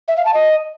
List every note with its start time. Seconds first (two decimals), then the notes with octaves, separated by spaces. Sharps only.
0.08 E5
0.17 F5
0.25 A5
0.34 D#5